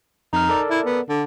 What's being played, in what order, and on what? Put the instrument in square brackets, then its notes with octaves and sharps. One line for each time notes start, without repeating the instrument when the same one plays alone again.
[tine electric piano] F2 F6 [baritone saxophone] D#4
[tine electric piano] A4 A#4 D5
[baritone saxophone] E4
B3
D3